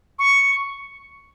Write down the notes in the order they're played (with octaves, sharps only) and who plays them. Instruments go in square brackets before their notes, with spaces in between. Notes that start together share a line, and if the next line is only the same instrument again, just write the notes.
[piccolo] C#6